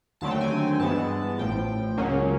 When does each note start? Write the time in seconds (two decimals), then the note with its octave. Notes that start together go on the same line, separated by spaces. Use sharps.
0.21 D#2 D3 F#3 A3 C4 A5
0.31 G5
0.41 G#5
0.79 G2 E3 G#3 B3 A5
1.38 A1 A2 F3 G5
1.97 C#2 C#3 F#3 A#3 C#4